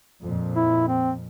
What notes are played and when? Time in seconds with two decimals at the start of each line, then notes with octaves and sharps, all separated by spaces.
0.23 F2 A#2
0.55 E4
0.88 C4